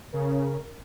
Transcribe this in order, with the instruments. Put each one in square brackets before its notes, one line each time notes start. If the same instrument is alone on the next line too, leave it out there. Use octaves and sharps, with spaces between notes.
[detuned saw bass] C#3 [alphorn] A#4